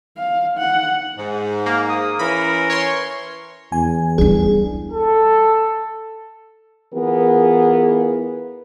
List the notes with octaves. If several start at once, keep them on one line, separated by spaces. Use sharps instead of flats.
F5
F#5
G#2
A#3
D#6
E3 C#4 A#4 B5
C#5 C6
E2 G#5
G3 D4 G#4
A4
E3 B3 F4 G#4 A#4